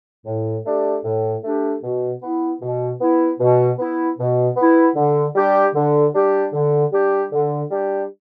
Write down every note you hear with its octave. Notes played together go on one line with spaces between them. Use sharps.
A2
A3 D4 G4
A2
A3 D4 G4
B2
B3 E4
B2
B3 E4
B2
B3 E4
B2
B3 E4
D3
G3 D4 G4
D3
G3 D4 G4
D3
G3 D4 G4
D3
G3 D4 G4